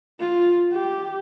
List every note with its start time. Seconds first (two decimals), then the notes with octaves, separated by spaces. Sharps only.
0.20 F4
0.72 G4